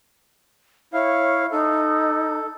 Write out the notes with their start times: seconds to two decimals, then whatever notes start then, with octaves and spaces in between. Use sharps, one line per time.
0.94 E4 C#5 F5
1.52 D#4 A4